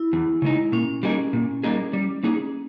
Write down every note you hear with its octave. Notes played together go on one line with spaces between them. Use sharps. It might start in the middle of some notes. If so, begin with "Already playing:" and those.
Already playing: E4
E2
C#3 G#3 D#4
A#2 C#4
G3 A#3 D#4 G#4
A#2
G3 A#3 D#4 G#4
G3
A#3 D#4 G#4